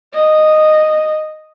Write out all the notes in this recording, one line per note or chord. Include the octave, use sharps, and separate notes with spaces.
D#5